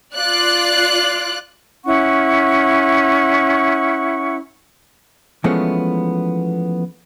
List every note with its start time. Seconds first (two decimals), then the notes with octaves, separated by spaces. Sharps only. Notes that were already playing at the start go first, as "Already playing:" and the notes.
0.16 F4 D5 F#6
1.84 C#4 E4 F#5 C#6
5.44 E3 F3 G#3 A3 B3 C#4